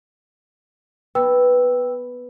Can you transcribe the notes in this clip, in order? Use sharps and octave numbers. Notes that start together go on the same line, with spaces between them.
B3 B4 G5 E6